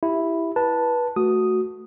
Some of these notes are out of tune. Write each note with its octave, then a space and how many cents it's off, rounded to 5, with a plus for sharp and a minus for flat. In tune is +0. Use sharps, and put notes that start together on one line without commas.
E4 +0 G4 +0
B4 -20 A5 +0
A3 +0 F#4 +0 D#6 +0